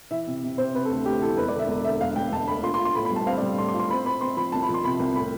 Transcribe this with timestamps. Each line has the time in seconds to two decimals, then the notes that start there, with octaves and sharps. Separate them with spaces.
0.11 E3 E5
0.27 C3
0.43 C3
0.58 C3 C5
0.75 C3 B4
0.85 A4
0.90 D2
1.05 D2 G4
1.22 E3 A4
1.37 E1 B4
1.48 D3 D5
1.59 E5
1.68 E1
1.85 D3 E5
2.01 E1 F5
2.16 E1 G5
2.32 E1 A5
2.48 D2 B5
2.63 F4 C6
2.74 C6
2.79 F4
2.85 C6
2.95 A2 B5
3.05 B5
3.11 G3
3.16 A5
3.26 C4 F5
3.38 G3 D5
3.58 A2 C6
3.68 C6
3.74 F4
3.79 C6
3.90 C4 B5
4.05 C4 B5
4.21 C4 C6
4.37 F3 B5
4.52 C2 A5
4.63 B5
4.69 F3
4.74 C6
4.84 C3 B5
5.00 C2
5.16 A2 B5